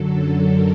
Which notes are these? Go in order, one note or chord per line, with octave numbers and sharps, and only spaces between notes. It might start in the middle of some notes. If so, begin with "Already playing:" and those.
Already playing: F#2 D3 F#3 A4
A#4